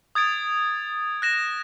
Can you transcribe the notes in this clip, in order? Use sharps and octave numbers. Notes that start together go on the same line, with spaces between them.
D#6 G#6 A6 D7
F#6 A#6 E7